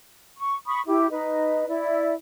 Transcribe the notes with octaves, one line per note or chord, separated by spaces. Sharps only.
C#6
B5 C#6 D#6
E4 G4
D#4 B4 D#5
E4 D5